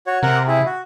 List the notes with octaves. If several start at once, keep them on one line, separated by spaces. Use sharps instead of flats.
F#4 C#5
C3 A#4 F#5
E4 G#4
F#4